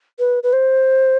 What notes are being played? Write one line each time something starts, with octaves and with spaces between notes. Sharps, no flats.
B4
B4
C5